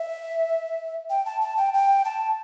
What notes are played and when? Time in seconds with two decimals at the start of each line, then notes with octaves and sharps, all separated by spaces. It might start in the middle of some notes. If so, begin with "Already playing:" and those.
Already playing: E5
1.10 G5
1.26 A5
1.41 A5
1.57 G5
1.74 G5
2.05 A5